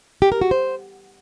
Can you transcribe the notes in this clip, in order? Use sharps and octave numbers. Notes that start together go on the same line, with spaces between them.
G4
A#4
F#4
C5